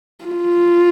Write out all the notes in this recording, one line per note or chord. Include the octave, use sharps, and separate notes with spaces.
F4